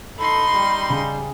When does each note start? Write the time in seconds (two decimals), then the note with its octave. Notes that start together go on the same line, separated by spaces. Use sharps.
0.18 D#4 A4 B5 C6
0.54 G3
0.90 C#3